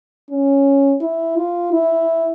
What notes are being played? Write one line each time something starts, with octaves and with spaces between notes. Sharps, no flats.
C#4
E4
F4
E4